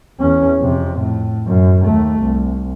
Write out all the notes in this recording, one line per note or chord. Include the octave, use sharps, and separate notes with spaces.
E2 C#4
F2 C3
A2
F#2
D#2 A3
C2